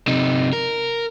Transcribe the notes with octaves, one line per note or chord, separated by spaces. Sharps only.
C3 D#4
A#4